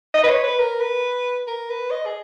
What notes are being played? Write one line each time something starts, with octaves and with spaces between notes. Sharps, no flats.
D#5
B4
C#5
B4
A#4
B4
A#4
B4
D#5
G#4